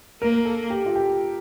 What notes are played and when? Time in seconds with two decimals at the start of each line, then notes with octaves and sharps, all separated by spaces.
0.21 A#3 A#4
0.45 A4
0.70 G4
0.86 F4
0.95 G4